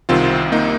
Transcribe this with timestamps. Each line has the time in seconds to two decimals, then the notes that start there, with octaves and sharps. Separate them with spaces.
0.09 C2 C3 D#3 C4 F4
0.52 A#3 D#4